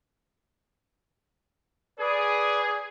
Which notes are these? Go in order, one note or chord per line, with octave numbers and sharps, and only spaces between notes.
G#4 B4 D5